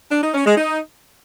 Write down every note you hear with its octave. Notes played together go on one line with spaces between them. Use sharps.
D4
D#4
C#4
G#3
D#4